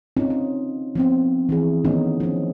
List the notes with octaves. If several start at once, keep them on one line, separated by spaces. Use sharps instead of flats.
C4 C#4 D#4 F4
C#4
F3 B3 C4
E3 E4 G#4
D#3 A3 B3 C#4 D#4
F3 C#4